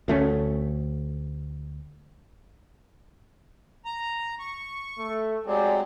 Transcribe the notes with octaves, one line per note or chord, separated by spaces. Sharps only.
D2 A3 C4 C#4
A#5
C#6
A3
F#3 G#3 C4 G4 D5 G#5